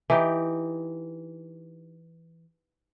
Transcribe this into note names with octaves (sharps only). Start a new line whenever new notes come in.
E3 D#4 G4